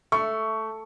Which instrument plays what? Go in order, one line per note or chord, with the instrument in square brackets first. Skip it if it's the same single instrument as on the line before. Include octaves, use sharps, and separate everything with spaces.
[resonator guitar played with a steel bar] A3 [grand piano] C#6